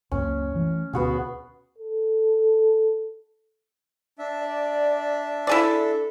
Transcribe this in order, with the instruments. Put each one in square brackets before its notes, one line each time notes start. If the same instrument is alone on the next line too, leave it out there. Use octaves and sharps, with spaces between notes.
[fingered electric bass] C#2 F#2 A#3 [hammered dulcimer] C#4
[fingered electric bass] E3 A3
[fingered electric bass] D2 B2 [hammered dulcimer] B3 F#4 G#4
[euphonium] A4
[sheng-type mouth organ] D4 E5
[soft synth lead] D5
[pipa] E4 G#4 D5 [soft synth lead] A4